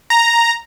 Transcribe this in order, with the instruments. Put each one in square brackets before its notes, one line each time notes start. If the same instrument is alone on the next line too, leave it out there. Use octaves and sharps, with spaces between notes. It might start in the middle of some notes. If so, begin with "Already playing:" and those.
[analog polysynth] A#5